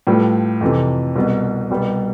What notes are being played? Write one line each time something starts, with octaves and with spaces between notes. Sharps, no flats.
A2 G3 B3 F4 A4
F2 C3 E3
C2 B2 B3
C2 B2 G3 B3